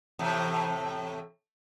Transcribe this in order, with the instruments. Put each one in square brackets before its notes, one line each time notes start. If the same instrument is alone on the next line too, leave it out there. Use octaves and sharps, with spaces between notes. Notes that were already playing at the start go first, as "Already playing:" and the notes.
[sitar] E2 A2 C3